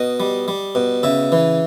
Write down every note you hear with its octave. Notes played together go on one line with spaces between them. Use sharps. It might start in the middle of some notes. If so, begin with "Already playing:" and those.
Already playing: B2 D#5
G3
G3
B2
C#3 E5
E3